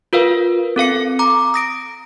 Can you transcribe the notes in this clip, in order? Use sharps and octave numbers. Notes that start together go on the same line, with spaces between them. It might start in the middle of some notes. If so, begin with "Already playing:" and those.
F4 A#4 B4 F5
C4 A4 F5 C#7
A#5 D6
D#6 A#6 D7